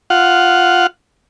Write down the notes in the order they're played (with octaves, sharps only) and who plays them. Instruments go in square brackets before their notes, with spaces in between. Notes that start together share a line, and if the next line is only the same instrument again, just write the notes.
[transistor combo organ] F4 F#5